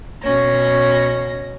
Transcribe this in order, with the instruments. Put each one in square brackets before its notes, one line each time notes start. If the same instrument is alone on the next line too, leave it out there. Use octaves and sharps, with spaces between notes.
[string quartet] B2 C#4 A#6